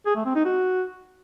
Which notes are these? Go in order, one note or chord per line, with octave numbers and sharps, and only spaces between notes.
G#4
A3
C4
D#4
F#4